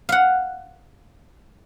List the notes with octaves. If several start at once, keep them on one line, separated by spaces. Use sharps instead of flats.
F5 F#5